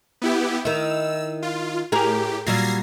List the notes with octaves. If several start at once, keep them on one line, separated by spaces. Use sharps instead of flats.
B3 E4 G4
D#3 E4 E6
F4
A2 G4 G#4 A#4
A#2 F#3 G3 G#6 A#6 C7